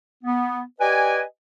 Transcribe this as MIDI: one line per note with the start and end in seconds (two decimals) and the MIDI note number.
0.24 0.61 59
0.79 1.21 67
0.79 1.21 71
0.79 1.21 74
0.79 1.21 75
0.79 1.21 80